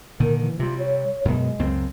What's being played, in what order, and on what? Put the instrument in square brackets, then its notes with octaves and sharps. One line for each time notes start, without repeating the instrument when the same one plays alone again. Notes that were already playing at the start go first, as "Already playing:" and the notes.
[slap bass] A#2 D3 D#3 [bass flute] A#4
[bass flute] E3
[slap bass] C3 G3 [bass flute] F4
[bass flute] C#5
[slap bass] F#2 B2 [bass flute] G#3
[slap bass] C#2 F#2 C4